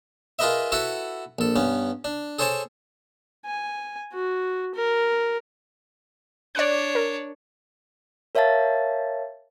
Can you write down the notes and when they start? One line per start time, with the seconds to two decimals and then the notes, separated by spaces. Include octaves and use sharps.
0.39 F4 G#4 A#4 B4 D#5 E5
0.72 E4 F#4 A4 B4 F#5
1.39 A#1 A4
1.56 G2 B3 C#4
2.05 D4
2.39 G#4 A4 C5 C#5 G#5 A5
3.46 G#5
4.13 F#4
4.74 A#4
6.55 D4 C#5 D5 F#6
6.95 A#4
8.35 A#4 C#5 E5 F5 A5 A6